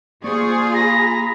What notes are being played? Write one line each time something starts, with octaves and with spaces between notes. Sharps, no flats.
A#3 F4 G#4 C5 D5 C#6
A#5 B5 A#6